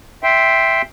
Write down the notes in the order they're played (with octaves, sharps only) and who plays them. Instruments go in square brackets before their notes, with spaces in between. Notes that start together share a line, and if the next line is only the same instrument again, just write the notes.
[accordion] E5 G5 C6